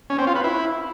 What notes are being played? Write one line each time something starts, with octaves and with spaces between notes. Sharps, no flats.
C#4
C4
F4
B4
E4